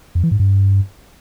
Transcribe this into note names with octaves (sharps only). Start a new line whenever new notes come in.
F2
E3
G#2
G2